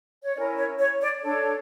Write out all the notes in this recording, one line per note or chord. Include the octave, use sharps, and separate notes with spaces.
C#5
C#4 E4 A#4 D5
C#5
C#5
D5
D4 A4 C#5